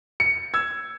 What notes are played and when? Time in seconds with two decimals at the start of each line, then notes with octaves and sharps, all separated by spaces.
0.20 C#7
0.54 E6 G#6